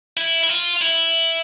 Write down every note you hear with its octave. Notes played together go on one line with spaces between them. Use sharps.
E4
E4
F4
E4